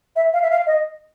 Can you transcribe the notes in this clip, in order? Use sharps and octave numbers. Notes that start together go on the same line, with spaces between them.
E5
F5
E5
F5
D#5